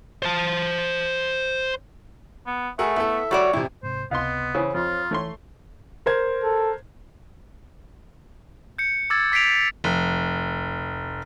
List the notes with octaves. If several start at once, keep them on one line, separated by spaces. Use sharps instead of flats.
C5 A5
B3
A3 G#4 A#4 E5 F#5
B3 E4 A4
G3 F#4 C#5 D5
F2 C3 E4
G#2 C3 C5
C#2 C3 B3 D#5 F5 C6
C#3 E3 C5 C#5
F2 F4
E3 A3 C#5 C6
A#4 C5 G#6
A4
G6 C#7
D6 E6 G#6 A6
D6 B6 C7 D7 F7
F1